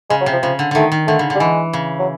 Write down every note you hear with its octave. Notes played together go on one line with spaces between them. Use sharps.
C#3 G#3
F#3
C3
F3
C#3 F3
D3
D3 D#3 A3
D#3
D3 A3
C#3
D3 G3
E3 G#3
C#3
F#3